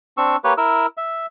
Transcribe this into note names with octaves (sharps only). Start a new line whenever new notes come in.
C4 D4 C#6 E6
A#3 G4 B4 C#5
E4 A#4 E6
E5